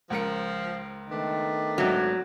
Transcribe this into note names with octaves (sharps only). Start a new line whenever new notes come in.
C#2 F3 A#4 C#7
D#3 A3 B3 D4
G#1 F#3 E5